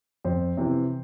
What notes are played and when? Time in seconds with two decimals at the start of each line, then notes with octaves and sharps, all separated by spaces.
0.25 F2 C5
0.57 C3 E3